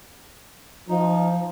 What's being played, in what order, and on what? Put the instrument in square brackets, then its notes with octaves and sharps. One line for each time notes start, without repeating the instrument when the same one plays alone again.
[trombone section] F3 [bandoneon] D#4